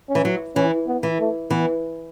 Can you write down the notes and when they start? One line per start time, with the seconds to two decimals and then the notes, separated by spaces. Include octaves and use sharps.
0.09 C#4
0.15 E3
0.25 F#3
0.56 E3 C#4
0.87 B3
1.03 E3
1.19 A3
1.50 E3 B3